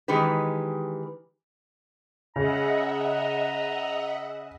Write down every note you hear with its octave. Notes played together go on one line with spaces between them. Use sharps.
D#3 E3 G#3 G4 B4
C#3 D#5 E5 F#5 A#5